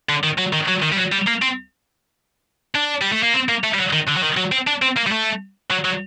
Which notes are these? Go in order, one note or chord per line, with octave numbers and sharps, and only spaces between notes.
D3
D#3
F#3
D#3
F#3
D#3
G3
F#3
G3
A#3
C4
D4
G3
A3
A#3
C4
A#3
A3
G3
F#3
D#3
D3
F#3
D#3
F#3
C4
D4
C4
A#3
G3
A3
F#3
F#3